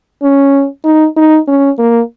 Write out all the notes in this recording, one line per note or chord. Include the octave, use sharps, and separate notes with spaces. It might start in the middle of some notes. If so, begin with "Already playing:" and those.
C#4
D#4
D#4
C#4
A#3